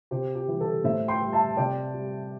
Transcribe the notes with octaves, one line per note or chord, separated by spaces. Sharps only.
C3 G4 C5
G4
E3 G3
A4
A2 C5 E5
G5 C6
G3
E5 A5
C3 D5 G5
G3